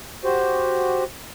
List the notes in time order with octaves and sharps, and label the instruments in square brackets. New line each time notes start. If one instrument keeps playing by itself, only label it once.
[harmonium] F#4 G4 C5